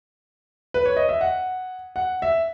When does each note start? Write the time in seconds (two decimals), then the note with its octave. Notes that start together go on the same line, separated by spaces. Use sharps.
0.74 B4
0.86 C#5
0.96 D#5
1.09 E5
1.21 F#5
1.96 F#5
2.22 E5